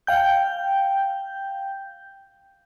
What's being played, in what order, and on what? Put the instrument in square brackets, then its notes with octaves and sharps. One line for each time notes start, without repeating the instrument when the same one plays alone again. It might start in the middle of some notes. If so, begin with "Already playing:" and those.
[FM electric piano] F5 G5 G6